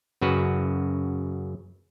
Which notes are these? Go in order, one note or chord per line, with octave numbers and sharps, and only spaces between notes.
F#2 C#3 F#4 B4